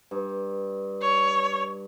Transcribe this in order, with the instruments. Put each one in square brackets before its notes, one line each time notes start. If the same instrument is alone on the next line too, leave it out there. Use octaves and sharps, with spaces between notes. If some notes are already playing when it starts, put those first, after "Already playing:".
[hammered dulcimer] G2
[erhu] C#5